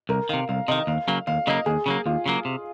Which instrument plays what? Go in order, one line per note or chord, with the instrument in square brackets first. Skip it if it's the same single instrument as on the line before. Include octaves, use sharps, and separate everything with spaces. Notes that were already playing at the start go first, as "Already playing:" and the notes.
[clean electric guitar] C2 [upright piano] A#4
[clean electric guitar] C3 D#3 [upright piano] F5
[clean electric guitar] C2 [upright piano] F5
[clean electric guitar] C3 D#3 [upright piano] D#5
[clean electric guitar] D#2 [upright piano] F5
[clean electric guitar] C#3 F#3 A#3
[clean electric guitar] D#2 [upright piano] F5
[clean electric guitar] C#3 F#3 A#3 [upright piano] D#5
[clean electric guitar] D#2 [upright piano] G#4
[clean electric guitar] C#3 F#3 A#3
[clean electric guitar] D#2 [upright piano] F4
[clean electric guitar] C#3 F#3 A#3
C3